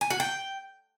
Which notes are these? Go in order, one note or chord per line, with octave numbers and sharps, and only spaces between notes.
G#5
F#4
G5